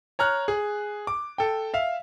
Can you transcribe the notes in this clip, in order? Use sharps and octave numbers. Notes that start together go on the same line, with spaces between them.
C#5 A#5 F6 F#6
G#4
D6
A4 G5
E5 F5